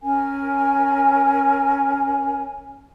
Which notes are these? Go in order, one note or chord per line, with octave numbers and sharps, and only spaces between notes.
C#4 A#4 G#5